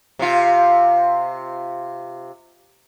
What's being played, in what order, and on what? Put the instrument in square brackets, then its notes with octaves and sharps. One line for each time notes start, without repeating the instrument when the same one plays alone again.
[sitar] C3 F4